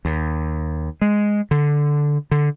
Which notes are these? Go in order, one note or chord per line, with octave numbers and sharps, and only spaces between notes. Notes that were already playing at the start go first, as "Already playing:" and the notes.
D#2
G#3
D3
D3